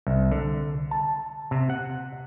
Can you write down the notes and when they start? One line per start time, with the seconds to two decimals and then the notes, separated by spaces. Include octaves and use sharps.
0.07 C2
0.32 D3
0.91 A5
1.51 C3
1.70 F#5